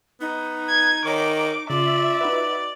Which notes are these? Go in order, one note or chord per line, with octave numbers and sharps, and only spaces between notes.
B3 D#4
G#6
D#3 C#5 A#5 D6
C#3 F4 D5 E5
D#4 F#4 B4